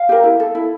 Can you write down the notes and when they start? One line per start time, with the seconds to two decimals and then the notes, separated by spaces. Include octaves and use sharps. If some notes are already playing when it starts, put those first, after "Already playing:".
Already playing: F5
0.09 G4 A#4
0.24 E4
0.40 A4
0.55 E4